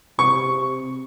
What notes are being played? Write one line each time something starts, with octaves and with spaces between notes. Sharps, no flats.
C3 C#6